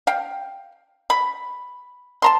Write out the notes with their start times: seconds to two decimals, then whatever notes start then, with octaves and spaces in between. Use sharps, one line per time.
0.07 F5 G5
1.10 B5
2.22 A5 A#5 C6